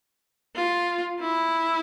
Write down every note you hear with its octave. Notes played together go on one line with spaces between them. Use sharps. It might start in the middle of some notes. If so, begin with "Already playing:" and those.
F4
E4